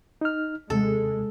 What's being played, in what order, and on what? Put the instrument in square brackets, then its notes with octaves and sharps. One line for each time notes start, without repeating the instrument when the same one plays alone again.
[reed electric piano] D#4 F6
[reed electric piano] D#2 C3 [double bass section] G#3 [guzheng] A4